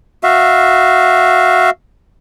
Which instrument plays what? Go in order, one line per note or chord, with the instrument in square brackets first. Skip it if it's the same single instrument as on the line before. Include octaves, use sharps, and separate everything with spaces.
[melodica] F#4 E5 F5